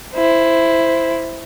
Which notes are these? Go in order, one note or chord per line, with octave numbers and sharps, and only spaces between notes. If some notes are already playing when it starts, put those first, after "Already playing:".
E4 C5